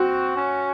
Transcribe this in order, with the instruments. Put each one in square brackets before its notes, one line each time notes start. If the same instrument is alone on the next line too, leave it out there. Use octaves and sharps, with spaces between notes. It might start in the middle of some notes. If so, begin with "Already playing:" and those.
Already playing: [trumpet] C4 [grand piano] F#4
[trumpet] C#4